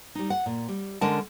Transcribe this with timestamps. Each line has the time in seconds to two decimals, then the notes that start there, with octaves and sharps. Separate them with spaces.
0.15 G3 D#4
0.30 F#5
0.46 A#2
0.68 G3
1.01 D3 G#3 C#4 A#4 F#5 A5